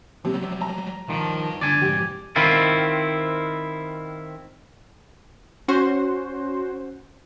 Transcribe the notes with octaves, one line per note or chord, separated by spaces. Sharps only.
C3 F#3 G3
A#5
D#3 F3 G3 A5
D3 D5 G#5
F2 G#2 G4
D#3 C4 E4 F4
C#4 F#4 C5